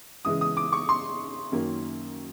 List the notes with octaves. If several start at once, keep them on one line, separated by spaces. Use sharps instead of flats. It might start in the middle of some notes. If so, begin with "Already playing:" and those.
C#3 E3 G#3 D#6
D#6
D6
C#6
C6
F#2 D#3 F#3 A#3 C#4